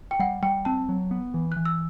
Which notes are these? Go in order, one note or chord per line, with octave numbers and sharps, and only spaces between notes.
G5
G3 F#5
G3 G5
C4 A5
F#3
B3
E3
E3 F#6
E6